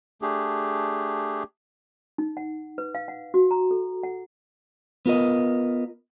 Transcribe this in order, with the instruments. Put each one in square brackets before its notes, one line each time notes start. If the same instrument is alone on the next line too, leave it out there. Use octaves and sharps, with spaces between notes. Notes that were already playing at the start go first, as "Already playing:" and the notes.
[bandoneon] A3 D4 G4 G#4
[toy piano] D#4
F#5
B4
F5
F#5
F#4
A#5
A4
F#5
[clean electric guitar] B3 F4 A#4 D#5